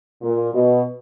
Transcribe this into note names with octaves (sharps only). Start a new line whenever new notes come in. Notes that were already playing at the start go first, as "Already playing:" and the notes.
A#2
B2